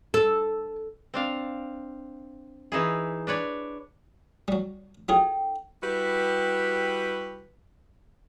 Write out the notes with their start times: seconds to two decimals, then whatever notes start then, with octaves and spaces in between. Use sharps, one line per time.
0.14 A4
1.14 C4 D4 F5
2.72 E3 D#4 E4 G#4
3.27 D4 B4 C#5 D5
4.48 F#3 G3
5.09 F#3 D#4 F4 G#4 A4 G5
5.83 G3 E4 F#4 G4 B4